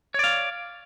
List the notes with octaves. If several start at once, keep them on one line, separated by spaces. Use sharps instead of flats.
C#5 D5 F5